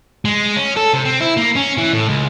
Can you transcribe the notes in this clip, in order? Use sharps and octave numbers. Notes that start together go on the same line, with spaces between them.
G#3
C#4
A4
C3
C4
E4
A#3
C#4
E3
A2
C#2